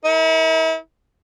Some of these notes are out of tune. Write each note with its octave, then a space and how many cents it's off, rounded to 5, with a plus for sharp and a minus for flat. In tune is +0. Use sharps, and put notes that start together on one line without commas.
E4 -40 A#4 +0